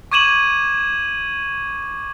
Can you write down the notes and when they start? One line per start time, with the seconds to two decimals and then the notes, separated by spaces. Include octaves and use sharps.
0.12 C#6 D6 G#6 D#7 E7 F#7